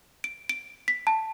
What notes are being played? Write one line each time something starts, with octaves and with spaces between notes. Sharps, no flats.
D7
D7
B6
A5